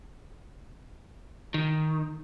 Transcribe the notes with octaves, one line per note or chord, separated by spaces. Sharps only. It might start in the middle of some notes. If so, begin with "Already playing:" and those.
D#3